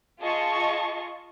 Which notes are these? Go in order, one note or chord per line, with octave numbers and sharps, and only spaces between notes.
F4 G#4 D#5 A5 C#6